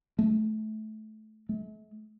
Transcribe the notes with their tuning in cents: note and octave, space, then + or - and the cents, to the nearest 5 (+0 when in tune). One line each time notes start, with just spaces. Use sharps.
A3 -20
A3 -45